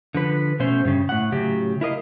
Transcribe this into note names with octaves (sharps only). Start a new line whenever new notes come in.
D3 F3 B4
B2 A3 C#4 C5
G2 C#3
A2 F#5
A2 C#3 F#3 G4
E4 A#4 D#5 F5